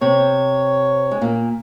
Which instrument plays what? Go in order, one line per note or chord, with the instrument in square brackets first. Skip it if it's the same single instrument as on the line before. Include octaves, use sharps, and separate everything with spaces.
[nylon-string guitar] C3 C4 [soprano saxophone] C#5
[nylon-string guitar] G#3
A#2 A#3